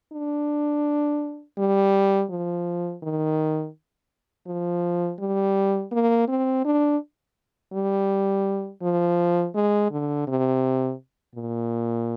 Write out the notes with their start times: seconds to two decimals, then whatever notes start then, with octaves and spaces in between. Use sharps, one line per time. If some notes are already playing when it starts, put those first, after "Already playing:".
0.13 D4
1.58 G3
2.30 F3
3.03 D#3
4.47 F3
5.20 G3
5.92 A#3
6.28 C4
6.65 D4
7.73 G3
8.82 F3
9.55 G#3
9.91 D3
10.27 C3
11.36 A#2